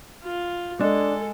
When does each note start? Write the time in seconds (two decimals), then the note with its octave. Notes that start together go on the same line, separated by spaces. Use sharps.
0.23 F4
0.81 G#3 D4 A4